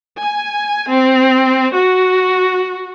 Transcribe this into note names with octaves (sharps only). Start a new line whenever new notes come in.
G#5
C4
F#4